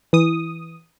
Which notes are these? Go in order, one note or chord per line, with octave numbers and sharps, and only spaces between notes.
E3 D#6